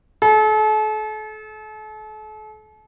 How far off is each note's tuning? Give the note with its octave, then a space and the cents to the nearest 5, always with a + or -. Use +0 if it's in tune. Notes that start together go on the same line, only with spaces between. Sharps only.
A4 -40